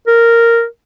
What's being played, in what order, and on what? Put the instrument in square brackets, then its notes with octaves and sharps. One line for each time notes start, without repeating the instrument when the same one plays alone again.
[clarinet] A#4